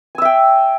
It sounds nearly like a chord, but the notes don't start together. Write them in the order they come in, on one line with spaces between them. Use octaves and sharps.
G#5 E6 E5 G5